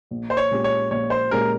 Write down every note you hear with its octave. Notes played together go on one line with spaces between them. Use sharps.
A#1
C5
C#5
A#2 G#3 C#4 G4
C#5
A#1 C#5
C5
A#2 G#3 C#4 G4 A#4